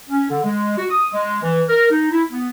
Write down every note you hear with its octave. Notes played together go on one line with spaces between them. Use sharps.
C#4
D3
G#3
F#4
D#6
G#3
E3
A#4
D#4
E4
B3